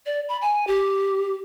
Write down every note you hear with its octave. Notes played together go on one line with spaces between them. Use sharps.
D5
B5
G#5
G4